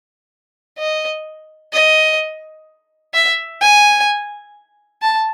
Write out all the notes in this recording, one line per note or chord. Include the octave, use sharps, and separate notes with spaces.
D#5
D#5
E5
G#5
A5